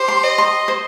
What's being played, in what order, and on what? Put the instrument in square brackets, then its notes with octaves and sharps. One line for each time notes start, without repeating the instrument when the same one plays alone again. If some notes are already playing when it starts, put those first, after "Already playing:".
Already playing: [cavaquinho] G4 [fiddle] C5
[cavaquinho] C6
[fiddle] D#5
[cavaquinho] C6
C5